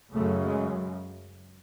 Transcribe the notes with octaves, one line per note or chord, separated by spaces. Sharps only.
F#2 C#3 A3
G#3